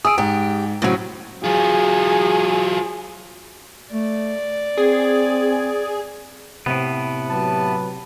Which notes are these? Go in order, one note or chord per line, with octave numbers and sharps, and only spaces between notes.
G#4 D#6 E6 D7
G#2 G4
A2 C#3 F#3 C4
F#3 F4 G#4
A3 D5
C4 G#4
A2 C3 B3
F#3 G4 B4 A5